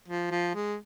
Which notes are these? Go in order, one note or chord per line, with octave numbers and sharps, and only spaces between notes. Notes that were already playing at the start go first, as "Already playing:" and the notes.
F3
F3
G#3